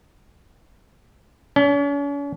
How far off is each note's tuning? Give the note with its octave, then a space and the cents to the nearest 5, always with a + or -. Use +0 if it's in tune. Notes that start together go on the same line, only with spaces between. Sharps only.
C#4 +45